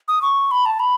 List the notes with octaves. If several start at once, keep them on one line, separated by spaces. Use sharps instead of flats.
D#6
C#6
B5
A5
B5